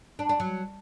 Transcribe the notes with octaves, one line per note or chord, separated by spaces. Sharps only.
D4
D4
F#3